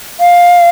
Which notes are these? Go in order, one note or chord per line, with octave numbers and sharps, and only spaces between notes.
F5